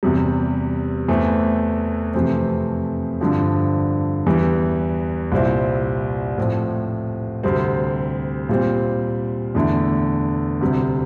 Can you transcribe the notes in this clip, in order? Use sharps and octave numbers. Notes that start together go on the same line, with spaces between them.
E2 C3 G3
E2 E3 A3 C4
F2 C3 E3 A3 C4
G2 D3 F3 C4
E2 E3 G3
C2 A#2 G3 C4 E4
A2 F3 C4
D2 C3 G3 C4
A#2 G3 C4
E2 D3 A3 E4
D2 C3 G3